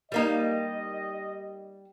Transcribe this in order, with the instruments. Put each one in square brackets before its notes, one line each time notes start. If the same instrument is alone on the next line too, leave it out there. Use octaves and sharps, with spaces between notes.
[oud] G3 A#3 D#4 [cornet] D#5